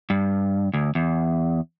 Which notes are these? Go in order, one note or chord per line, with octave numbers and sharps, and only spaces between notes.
G2
D2
E2